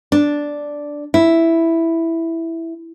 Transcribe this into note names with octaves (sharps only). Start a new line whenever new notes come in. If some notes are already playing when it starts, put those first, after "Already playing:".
D4
E4